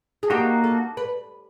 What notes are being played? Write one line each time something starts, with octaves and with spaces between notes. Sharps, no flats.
G#4
A#3 D#4 F#4 G4
A4
B4